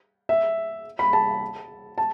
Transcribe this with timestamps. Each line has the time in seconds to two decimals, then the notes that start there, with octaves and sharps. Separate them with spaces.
0.29 E5
0.99 B5
1.13 A5
1.98 A5